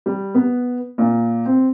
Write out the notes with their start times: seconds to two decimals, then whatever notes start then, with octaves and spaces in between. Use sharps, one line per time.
0.06 G3
0.35 B3
0.98 A#2
1.45 C4